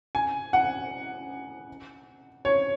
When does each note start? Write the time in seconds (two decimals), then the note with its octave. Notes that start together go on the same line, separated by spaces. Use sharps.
0.15 G#5
0.53 F#5
2.45 C#5